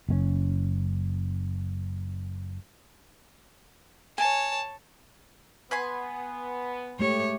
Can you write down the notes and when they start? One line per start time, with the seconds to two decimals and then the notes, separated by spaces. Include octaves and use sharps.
0.09 F#1 B2 C#4
4.18 C#5 G#5 A5
5.71 B3 B4 G#5 C6
6.99 G#3 A3 G4 C#5